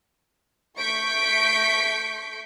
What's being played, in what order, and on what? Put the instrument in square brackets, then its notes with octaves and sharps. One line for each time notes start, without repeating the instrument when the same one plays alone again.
[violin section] A3 C#6 G6 B6 D7